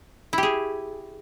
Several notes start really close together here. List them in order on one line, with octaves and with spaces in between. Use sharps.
E4 G4 G#4